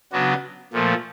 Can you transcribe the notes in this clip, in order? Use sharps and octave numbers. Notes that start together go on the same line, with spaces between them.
C#3 F#3 B3 D4 F#4
A#2 F3 A3